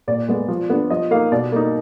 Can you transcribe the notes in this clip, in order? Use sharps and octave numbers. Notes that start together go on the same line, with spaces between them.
A#2 D5
G#3 B3
F3
B3 D4
F3 D#5
A#3 D#4 F5
B2 D5
A#3 D#4